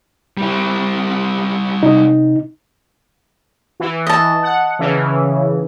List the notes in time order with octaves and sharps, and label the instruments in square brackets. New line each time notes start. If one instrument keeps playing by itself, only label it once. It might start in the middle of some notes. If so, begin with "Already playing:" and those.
[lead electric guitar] G3 E4
[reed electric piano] C3 D#4
[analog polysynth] E3
[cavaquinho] D#5 A5
[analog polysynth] F#5
C#3 E3